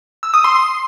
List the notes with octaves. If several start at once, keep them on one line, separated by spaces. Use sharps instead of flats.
E6
D#6
C6